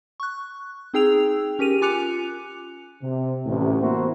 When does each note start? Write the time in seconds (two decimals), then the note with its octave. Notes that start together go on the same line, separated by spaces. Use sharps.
0.20 C#6 F#6
0.94 C4 D#4 G#4 G5 E6 F7
1.59 C#4 G4 A#4 D#7 F7
1.81 F4 G#5 D6 F#6 C#7 F7
3.02 C3
3.45 A1 D2 C3
3.81 A#3 B3 E4 F#4 A#4 C5